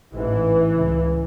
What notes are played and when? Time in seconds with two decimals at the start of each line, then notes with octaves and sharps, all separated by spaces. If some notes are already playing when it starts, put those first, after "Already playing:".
0.13 A1 G#2 E3
0.74 C#2 C#3